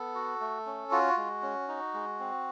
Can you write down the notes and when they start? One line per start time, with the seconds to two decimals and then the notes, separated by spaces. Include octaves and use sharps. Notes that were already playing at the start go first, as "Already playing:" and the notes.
Already playing: B3 A4
0.15 F#4
0.41 A3
0.66 C#4
0.91 F4 F#4
1.17 G#3
1.43 C#4
1.68 D#4
1.94 G#3
2.19 C4